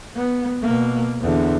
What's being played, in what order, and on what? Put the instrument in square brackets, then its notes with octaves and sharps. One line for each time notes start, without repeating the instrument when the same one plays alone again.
[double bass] B3
B2 A#3
E2 D3